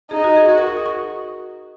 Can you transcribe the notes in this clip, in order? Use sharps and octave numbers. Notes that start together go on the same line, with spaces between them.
D#4 G#4
F#4
G#4
F#4 G#4
A#4
C#6
D#6
C#6